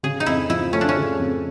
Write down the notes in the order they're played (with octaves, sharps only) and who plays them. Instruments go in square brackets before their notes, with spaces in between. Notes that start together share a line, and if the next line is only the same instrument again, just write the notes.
[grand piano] C#3 [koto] G#4
[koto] D#4
[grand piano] F2 [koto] E4
[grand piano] F3 [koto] E4
[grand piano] A3 [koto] C#4
[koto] D4
C#4
[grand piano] C#3
F2